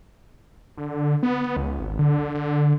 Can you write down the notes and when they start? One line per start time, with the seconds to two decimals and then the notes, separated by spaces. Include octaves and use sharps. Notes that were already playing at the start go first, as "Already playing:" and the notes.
0.78 D3
1.23 B3
1.57 C#2
1.80 G#1
1.99 D3
2.34 D3